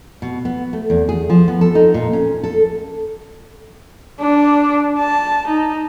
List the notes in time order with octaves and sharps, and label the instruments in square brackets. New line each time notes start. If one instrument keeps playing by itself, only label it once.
[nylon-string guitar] B2
B3
A3
E2
G#4
F3
B3
A4
D#4
A#2
C#4
A4
[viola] D4
A5
D#4